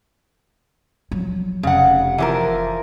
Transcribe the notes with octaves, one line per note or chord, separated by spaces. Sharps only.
F3 F#3
F1 C#3 F#5
E3 F3 A#4